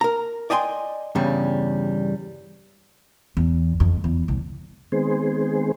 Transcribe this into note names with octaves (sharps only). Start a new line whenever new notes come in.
A#4 A#5
D5 D#5 G5 G#5 B5 C6
E2 G2 C#3 G3
E2
F2
E2
C2
D#3 G#3 B3 C4 G#4 C5